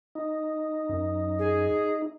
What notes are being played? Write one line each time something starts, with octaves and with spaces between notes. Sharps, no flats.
D#4
F#2
G#4